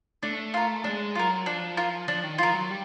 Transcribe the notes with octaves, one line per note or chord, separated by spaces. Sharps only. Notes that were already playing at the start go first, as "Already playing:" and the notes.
A3 D4
F4 A#4
G#3 D4
F#3 F4 A#4
F3 D4
F4 A#4
F3 D4
D#3
F3 F4 A#4
F#3
G3